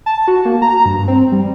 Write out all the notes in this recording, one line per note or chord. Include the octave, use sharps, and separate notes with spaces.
A5
F#4
A#3
A#5
G2
C4
G3